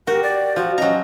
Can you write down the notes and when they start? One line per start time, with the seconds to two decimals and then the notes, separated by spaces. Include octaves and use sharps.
0.07 F#4 G4 A#4
0.23 D5
0.56 F3 F#4
0.78 F#3 C#4 D#5 A#5